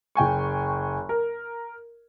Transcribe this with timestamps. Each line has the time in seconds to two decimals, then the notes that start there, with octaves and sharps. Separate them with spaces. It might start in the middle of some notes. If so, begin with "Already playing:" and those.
0.15 F#1 G5 G#5 C#6
1.09 A#4